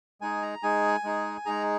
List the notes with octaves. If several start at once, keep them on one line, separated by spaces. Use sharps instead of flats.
G#3 D#4 G#4 G#5
A#5
G#3 D#4 G#4 G#5
G#3 D#4 G#4
G#3 D#4 G#4 A#5